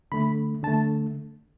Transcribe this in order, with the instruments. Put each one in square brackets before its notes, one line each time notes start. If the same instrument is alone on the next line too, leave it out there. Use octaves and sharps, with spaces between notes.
[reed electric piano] D3 A3 B5
D3 A5
A3